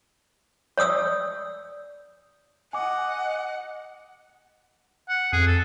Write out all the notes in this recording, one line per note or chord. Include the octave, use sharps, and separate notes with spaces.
C#5 D5 D#6 E6
D#5 F#5 G#5 D6
F#5
F2 G#4
A4